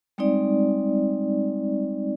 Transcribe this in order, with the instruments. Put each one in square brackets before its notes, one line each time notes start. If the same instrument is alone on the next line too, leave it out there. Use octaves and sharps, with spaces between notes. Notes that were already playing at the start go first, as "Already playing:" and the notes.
[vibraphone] G3 G#3 C4 D#4 D5